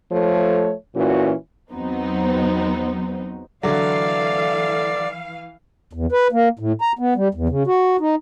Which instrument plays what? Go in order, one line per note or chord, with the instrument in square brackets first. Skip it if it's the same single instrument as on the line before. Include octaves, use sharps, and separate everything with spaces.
[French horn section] F3 A3 A4 C#5
A#2 E3 C#4 F#4
[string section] E2 F#3 B3 C4 D#4
[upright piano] D3 F#3 [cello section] E3 F5 [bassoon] A3 [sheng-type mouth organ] D5
[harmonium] E2
B4
A#3
A2
A#5
B3
G3
E2
C#3
F#4
D#4